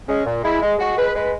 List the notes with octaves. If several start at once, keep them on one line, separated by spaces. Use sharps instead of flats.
G#3 C#4
A#2
G#3 E4
G#3
G#3 F#4
G#3 B4
G#3 B4